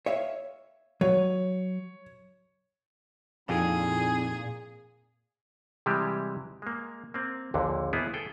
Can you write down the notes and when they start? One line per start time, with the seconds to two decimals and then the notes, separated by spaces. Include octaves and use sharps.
0.06 C#5 E5 F5
1.01 F#3 C#5
3.49 F2 A#2 C4 D#4 E4 G#4
5.86 C3 E3 G3 G#3 G4
6.62 G#3 A#3
7.14 A#3 C4
7.54 A#1 D#2 A#2 D3
7.93 A#3 B3 E4 G#4
8.14 G#4 A4 G5